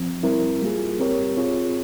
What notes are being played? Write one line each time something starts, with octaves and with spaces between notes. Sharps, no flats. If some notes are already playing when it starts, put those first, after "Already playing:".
Already playing: F3 C4
G3 C4 E4 A#4
G3 A#3 F4 G#4
C4 G4 A#4 C#5
C4 F4 G#4 C#5